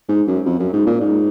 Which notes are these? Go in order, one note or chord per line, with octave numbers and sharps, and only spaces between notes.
G#2
F#2
F2
F#2
G#2
A#2
G#2